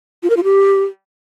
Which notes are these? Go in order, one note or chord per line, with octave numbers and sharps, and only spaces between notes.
F4
A#4
F4
G4